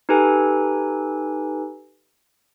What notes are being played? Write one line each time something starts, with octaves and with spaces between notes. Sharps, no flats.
D#4 G4 A4 B4 G#5